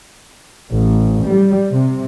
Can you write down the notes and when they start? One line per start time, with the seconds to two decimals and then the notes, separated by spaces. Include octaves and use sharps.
0.71 A1
1.27 G3
1.74 C3